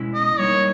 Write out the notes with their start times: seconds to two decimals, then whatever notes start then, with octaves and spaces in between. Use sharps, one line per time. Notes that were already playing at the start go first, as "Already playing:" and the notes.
Already playing: B2 G#3 C#4 E4
0.14 D#5
0.39 G3 A#3 D#4 C#5